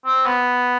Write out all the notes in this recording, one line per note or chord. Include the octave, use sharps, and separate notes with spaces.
C4
B3